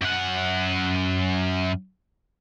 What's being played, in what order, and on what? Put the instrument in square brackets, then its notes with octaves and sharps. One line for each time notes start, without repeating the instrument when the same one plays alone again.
[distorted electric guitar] F#2 F#5